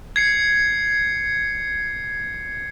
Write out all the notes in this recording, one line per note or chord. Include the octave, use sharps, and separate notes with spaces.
G#6 C7 C#7